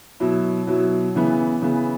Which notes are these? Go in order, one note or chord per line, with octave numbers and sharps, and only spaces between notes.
B2 F#3 E4
B2 F#3 E4
C#3 E3 B3
C#3 E3 B3